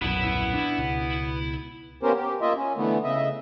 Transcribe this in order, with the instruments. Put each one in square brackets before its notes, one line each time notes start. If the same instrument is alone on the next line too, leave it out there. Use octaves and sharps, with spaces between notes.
[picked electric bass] D#1 B1 F#2 [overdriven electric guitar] B3 [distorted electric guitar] E4 B5
[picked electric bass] D4
C#2 B2
[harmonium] A#3 B3 C#4 G4 A#4 C5
G4
A#3 F4 D#5 E5
C#4
D3 E3 A3 B3
C#3 D#5 E5